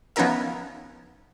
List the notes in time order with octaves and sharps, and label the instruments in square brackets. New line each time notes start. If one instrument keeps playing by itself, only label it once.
[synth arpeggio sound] F3 B3 C#4 D#4 A#4 E5